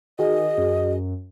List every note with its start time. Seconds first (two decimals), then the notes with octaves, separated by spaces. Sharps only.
0.19 D#3 F#4 G#4 D#5
0.58 F#2